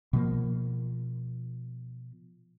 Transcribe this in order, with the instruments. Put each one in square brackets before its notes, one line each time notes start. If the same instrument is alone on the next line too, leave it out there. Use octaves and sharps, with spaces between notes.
[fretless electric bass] B2 F3 A#3